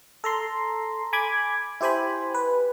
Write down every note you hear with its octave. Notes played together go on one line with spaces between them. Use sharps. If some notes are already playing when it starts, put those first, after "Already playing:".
A4 A#5 C6
G#5 B5 D6 G#6
E4 G4 C5 G#5 B5
B4